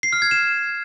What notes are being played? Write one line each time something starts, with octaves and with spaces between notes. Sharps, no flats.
C7
F6
G#6
E7